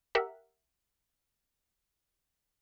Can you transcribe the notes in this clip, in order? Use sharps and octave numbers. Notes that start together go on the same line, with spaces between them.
G4 A#4 E5 F#5